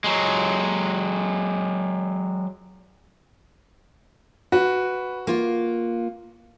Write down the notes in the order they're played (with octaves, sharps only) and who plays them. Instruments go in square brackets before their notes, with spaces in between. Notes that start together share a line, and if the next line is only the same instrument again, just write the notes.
[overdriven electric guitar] F#3 G#3
[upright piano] F#4 [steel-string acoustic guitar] B4
[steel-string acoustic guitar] A#3 F4